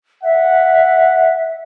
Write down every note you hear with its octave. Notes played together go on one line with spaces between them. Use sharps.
E5 F#5